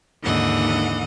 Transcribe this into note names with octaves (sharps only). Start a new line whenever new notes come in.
D#2 G#2 D3 E3 D#5 F#5